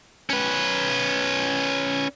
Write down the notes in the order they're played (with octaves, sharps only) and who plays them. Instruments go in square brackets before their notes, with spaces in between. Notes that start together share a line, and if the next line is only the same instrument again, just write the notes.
[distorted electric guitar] C#4 B4